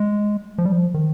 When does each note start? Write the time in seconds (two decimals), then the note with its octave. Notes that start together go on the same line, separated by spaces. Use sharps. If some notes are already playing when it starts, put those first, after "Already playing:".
Already playing: G#3
0.58 F3
0.65 G3
0.72 F3
0.94 D#3